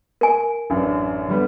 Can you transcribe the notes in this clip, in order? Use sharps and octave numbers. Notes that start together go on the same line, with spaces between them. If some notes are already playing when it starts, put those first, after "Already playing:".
A#4 G#5
A1 F#2 D4
D3 G3 B3